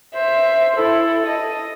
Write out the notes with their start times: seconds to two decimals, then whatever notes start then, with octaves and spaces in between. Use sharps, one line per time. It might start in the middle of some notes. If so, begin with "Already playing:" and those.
0.15 C5 E5
0.77 E4 A4
1.27 D#5